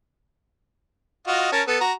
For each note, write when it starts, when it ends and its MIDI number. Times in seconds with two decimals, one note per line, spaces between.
1.27 1.50 65
1.27 1.50 66
1.27 1.50 75
1.52 1.63 61
1.52 1.63 70
1.52 1.63 81
1.67 1.80 59
1.67 1.80 69
1.81 1.93 66
1.81 1.93 82